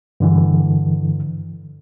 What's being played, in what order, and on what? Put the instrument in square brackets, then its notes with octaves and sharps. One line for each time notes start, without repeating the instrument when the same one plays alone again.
[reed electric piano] G2 D3 E3